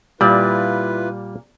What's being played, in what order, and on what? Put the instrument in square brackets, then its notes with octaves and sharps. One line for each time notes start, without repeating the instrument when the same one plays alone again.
[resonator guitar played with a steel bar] A#2 [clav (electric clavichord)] G3 [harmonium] E4 F4 B4